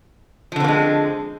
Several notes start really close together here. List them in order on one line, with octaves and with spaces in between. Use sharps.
F3 D3 C4 A#3 G#3